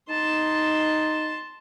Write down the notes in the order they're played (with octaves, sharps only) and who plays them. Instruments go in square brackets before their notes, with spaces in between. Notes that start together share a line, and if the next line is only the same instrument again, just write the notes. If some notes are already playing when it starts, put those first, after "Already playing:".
[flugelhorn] D#4 [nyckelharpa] A5 C6